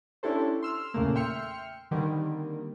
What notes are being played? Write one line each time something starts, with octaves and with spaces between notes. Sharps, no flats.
C#4 D4 E4 G4 A4 C5
C6 E6 F6
E2 A#2 C#3 A3 A#3
E5 G5 C6 F6 C#7
D3 D#3 G3 A#3 C4